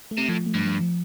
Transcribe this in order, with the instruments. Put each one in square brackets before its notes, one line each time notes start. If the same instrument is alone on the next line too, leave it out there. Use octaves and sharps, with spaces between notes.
[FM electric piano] A3
[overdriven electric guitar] C3
[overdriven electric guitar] A2 [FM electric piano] F3
[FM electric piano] A3
[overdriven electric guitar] G2
[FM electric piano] F3
F3